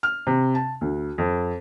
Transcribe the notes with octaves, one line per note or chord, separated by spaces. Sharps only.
F6
C3
A5
D2
F2